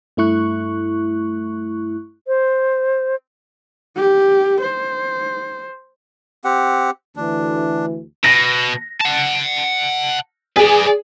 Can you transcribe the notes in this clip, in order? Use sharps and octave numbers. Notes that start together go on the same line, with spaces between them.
G2 A3 E4 C#6 F#6
C5
G4
C5
C4 G4 F#5
D2 E3 D4
B2 A#6
F#5 A5
G#4 B4 D5